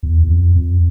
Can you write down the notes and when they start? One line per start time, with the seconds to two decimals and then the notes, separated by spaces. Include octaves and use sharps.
0.03 E2
0.23 E2
0.29 F2
0.55 F2